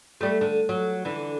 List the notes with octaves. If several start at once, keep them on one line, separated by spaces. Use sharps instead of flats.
G3 A3
D3
F#3
D3 E3